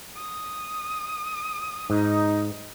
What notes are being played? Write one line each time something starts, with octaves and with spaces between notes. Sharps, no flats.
D#6
G#2 D#4